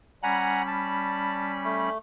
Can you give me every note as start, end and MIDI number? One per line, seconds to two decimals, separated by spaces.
0.23 1.89 55
0.23 1.89 61
0.23 0.62 78
0.23 0.62 80
0.23 0.62 82
0.23 1.89 83
0.67 1.52 81
1.64 1.98 57